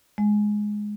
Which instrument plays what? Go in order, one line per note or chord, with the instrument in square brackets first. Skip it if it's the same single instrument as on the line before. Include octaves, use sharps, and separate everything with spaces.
[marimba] G#3